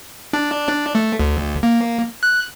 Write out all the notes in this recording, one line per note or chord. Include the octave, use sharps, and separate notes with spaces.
D4
D4
A3
D2
A#3
F#6